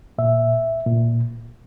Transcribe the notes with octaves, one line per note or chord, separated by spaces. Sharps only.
A#2 E5
A#2